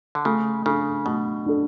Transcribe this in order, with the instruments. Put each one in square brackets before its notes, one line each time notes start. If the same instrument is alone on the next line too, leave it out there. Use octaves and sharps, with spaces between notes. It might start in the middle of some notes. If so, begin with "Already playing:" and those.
[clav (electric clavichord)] D3
[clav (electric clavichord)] C#3 [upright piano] A3
[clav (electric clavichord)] C#3 [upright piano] D4 A4
[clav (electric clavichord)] B2 [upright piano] A3
[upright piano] D4 A4